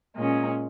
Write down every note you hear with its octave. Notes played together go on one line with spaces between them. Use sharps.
A#2 G#3 C#4